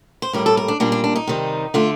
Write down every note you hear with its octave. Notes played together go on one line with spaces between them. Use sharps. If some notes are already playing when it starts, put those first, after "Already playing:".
C5
A2 G3 A#3 A#4
A4
A#4
D4
A#2 G3 A#3 D4
D4
D4
D#4
C3 D#3 G3
D3 A3 F4